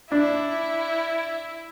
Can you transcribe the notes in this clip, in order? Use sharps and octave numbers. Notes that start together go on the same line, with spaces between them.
D4 E4